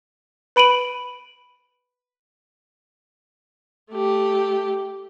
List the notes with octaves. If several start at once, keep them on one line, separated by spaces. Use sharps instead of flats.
B4 B5 D7 D#7 F#7
A3 G4